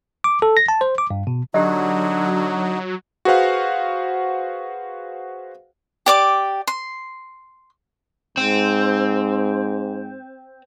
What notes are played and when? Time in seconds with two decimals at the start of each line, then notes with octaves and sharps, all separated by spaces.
0.24 D6
0.42 A4
0.57 A#6
0.68 A5
0.81 C5
0.98 D6
1.10 G2
1.27 B2
1.54 D3 F#3 D#4 F#4 G4 D#5
3.25 F#4 G#4 B4 C5 F5 F#5
6.06 G4 D5 D6
6.67 C6
8.37 G#2 C4